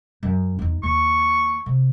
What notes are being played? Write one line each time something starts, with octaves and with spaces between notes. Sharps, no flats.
F#2
E2 D#4
D#2 C#6
C3